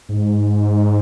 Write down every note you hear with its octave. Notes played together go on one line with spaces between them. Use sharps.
G#2